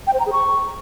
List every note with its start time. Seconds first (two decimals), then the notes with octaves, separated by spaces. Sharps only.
0.07 G5
0.13 C5
0.20 A#5
0.26 G#4
0.32 C#6